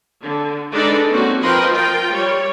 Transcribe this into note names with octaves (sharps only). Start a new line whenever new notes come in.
D3
G#3 D4 D#4 A4 B4 D5
A#3 C4 C#4 D#4 F#4
F3 A#4 B4 D#5 G5 C6
F4 A#4 G5
G3 C#5